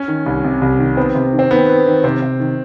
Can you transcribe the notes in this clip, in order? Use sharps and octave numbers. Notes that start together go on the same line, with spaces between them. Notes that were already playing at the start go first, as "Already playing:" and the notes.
Already playing: C#4
D#3
C2
C3
C2
D#3
B3 C4
C3
D#3
C4
D#3 B3
B3
D#3
C3 C4
C3
D#3